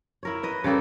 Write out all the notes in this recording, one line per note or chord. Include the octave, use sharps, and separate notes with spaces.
E4 A#4 C#5
B4 D#5
C#3 G3 A#3 A4